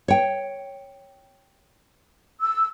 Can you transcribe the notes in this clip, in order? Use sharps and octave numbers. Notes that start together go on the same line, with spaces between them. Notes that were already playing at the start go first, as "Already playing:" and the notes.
C#5 G5
E6